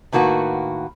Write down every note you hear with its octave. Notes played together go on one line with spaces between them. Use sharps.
A2 D#3 A#3 F#4 B4